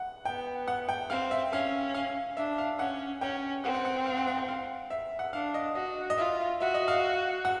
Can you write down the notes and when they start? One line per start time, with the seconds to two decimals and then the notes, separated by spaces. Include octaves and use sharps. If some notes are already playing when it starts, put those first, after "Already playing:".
Already playing: F#5
0.25 B3 G5
0.68 F#5
0.89 G5
1.10 C4 F5
1.31 E5
1.52 C#4 F5
1.94 F5
2.37 D4 E5
2.58 F5
2.79 C#4 F#5
3.21 C#4 G5
3.64 C4 F#5
3.74 F#5
3.85 F#5
4.06 F5
4.17 F#5
4.27 F#5
4.37 G5
4.48 F5
4.90 E5
5.19 F#5
5.33 D4 F5
5.54 D#5
5.75 F#4 D#5
6.10 D#5
6.18 F4 E5
6.60 F#4 E5
6.74 D#5
6.88 F5
7.45 F#5